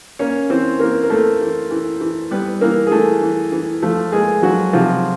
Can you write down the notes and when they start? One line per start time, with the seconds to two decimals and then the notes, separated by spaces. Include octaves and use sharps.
0.19 A#3 C#4 C#5
0.50 E3 C4 C5
0.79 E3 A#3 A#4
1.03 A#4
1.10 A3 A#3 A4
1.41 E3
1.71 E3
2.01 E3
2.31 G3 B3 B4
2.61 E3 A#3 A#4
2.87 G#4
2.91 E3 A3 A4
3.22 E3
3.52 E3
3.82 F3 A3 A4
4.12 G#3 A#3 G#4
4.42 F3 F#3 F#4
4.73 C3 F3 F4